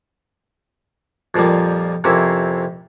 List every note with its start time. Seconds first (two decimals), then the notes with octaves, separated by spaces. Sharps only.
1.34 F2 A#2 F3 G3 A#3
2.04 F2 C3 A#3 C4 C#4 E4